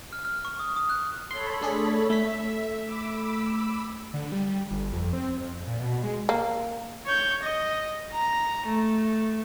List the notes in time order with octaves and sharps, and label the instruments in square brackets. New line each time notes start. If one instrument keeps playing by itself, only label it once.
[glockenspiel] F6
F6
C#6
D#6
D#6
F#6
[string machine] A4 C#5 B5 [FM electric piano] C6
[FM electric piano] A3 D4 G#4
[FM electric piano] A3 B6 [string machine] E5
[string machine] B5 D6 E6
[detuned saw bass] D3
G3
G3
G1
F2
C4
F2
A#2
B2
G#3
[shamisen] A#3
[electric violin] C#5 G6
D#5
A#5
A3